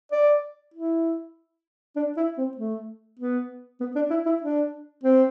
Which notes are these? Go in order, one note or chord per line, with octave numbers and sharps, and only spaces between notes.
D5
E4
D4
E4
C4
A3
B3
B3
D4
E4
E4
D4
C4